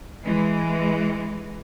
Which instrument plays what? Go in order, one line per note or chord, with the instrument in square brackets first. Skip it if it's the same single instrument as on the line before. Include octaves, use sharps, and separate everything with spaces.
[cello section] E3 G#3